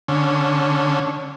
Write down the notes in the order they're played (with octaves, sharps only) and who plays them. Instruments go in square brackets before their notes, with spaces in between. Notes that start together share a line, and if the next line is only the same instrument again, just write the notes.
[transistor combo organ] D3 C#4